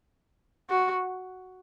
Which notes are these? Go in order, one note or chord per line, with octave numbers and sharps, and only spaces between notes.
F#4